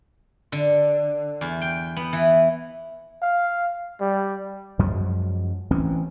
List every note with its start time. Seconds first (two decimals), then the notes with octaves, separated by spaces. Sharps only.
0.52 D3
1.41 E2
1.61 G5
1.96 B3
2.13 E3
3.22 F5
4.01 G3
4.79 F#2 F3 F#3 G#3
5.71 A1 E3 C4 C#4